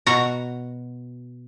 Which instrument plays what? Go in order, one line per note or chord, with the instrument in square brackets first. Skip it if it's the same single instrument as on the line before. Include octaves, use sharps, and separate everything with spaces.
[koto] B2 F#4 A#5